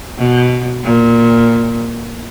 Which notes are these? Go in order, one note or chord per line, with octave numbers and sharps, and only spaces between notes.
B2
A#2